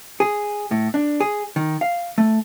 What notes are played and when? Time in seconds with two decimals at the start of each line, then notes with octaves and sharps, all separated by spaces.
0.20 G#4
0.71 A2
0.94 D4
1.20 G#4
1.56 D#3
1.81 F5
2.18 A3